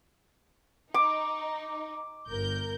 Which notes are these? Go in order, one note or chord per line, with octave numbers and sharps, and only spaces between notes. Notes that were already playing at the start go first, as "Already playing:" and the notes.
D#4 D6
G1 A#4 G6